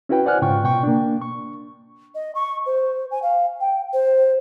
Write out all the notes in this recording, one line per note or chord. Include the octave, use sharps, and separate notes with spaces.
C#4 E4 F#4 B4 G5
C5 D5 F#5 G#5 F6 F#6
G#2 C#3 F4 G5 C#6
B2 G5 C#6
A#3 D4
C#6
D#5
C#6
C5
G#5
F5
G5
C5